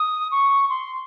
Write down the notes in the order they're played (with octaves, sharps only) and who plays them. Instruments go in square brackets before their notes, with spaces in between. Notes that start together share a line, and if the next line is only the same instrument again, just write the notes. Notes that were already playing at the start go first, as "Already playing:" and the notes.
Already playing: [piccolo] D#6
C#6
C6